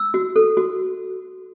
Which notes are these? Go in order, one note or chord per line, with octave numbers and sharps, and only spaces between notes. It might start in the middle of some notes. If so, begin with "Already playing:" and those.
Already playing: E6
F#4
A4
F#4